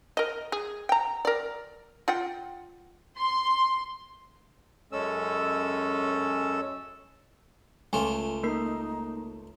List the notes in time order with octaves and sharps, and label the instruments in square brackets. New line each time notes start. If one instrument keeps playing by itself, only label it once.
[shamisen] A#4 D#5
G#4
G5 A#5
A#4 D5
F4 F#5 G5
[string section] C6
[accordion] F#2 G#3 C#4 A4 E6
[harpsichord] C#2 A3 F4 [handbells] G#5
[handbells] A#3 A#4 C7 [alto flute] D#4